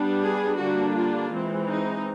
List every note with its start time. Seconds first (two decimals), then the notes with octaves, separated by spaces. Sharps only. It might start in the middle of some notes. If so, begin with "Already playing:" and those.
Already playing: G3 B3 D4
0.24 G#4
0.60 D3 G3 A#3 D4 F#4
0.95 F4
1.32 E3 G#3 C4
1.68 D#4